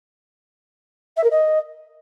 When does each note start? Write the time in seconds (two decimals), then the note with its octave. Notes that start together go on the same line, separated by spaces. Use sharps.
1.17 E5
1.23 A#4
1.30 D#5